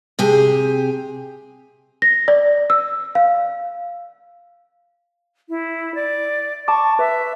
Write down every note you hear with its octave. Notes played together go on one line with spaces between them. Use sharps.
C3 G4 G#4
A#6
D5
E6
F5
E4
D5
A5 C#6 D6
B4 E5